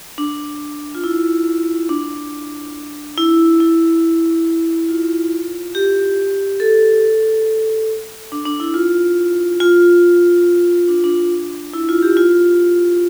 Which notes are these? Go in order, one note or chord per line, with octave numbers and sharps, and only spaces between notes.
D4
F4
E4
D4
E4
E4
F4
G4
A4
D4
D4
E4
F4
F4
D4
D4
E4
F4
G4
F4